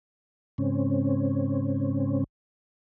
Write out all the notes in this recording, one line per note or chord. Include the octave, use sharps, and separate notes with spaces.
G#2 C#3 C4 C#4